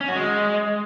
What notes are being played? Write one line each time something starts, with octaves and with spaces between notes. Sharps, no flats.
C#4
F#4
G#3